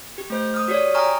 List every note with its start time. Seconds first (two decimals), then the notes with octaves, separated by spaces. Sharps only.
0.18 G4
0.30 A3 C5 G6
0.54 D#6 F6
0.68 F#4 G4 C#5 D5
0.94 G5 G#5 A#5 C#6 D#6 F6